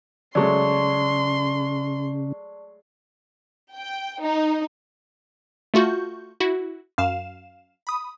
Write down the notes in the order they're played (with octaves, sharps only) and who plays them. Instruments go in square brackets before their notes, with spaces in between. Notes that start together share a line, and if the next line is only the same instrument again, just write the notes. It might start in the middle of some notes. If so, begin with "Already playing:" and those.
[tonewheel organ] C#3 [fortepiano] F#3 G#3 A3 [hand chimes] D5 A5 C#6 [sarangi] C6
[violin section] G5
D#4
[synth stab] A3 F4 F#4 C#6 G6
E4 F#4
F#2 F5 E7
B5 D#6